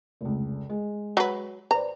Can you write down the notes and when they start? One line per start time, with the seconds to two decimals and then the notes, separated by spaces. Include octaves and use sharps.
0.21 F1 C#2
0.69 G#3
1.17 F#3 B4
1.71 B4 C5 D5 A#5